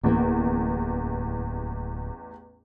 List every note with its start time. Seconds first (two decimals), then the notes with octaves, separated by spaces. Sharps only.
0.03 D1 A1 E2 A#3